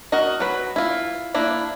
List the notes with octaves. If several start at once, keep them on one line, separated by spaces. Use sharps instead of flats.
F#4 A#4 D#5
F#3 B4
E4 F4
A#3 D4 E4